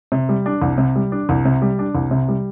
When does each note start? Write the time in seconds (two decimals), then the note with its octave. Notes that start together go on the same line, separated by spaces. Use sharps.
0.12 C3
0.29 G3
0.46 D4
0.62 C2
0.78 C3
0.96 G3
1.12 D4
1.29 C2
1.45 C3
1.62 G3
1.79 D4
1.95 C2
2.11 C3
2.28 G3